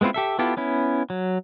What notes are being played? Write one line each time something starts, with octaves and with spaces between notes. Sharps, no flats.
G#3 B3 C4 E4 F4
G4 A4 E5
B3 E4 F4 G4 A4
B3 C#4 E4
F#3